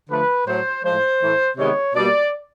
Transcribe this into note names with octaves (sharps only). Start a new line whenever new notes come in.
D3 F3 A3 B4
A2 F#3 A3 C5
A2 F3 G#3 C5
A2 E3 A3
C3 D#3 G#3 B3 C#5
B2 G3 A#3 D5